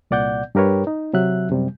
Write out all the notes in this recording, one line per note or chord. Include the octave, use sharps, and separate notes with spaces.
C2 A#2 D5 F#5 G6
G2 G4 A#4 B4 C#5
D#4
C3 F#3 E5 F#6
F#2 C3 G3